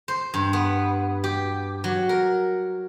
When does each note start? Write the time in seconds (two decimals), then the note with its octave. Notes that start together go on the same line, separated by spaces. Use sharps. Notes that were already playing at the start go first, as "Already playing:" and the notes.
0.08 C5
0.34 G2
0.53 B3
1.24 G4
1.84 F#3
2.09 A#4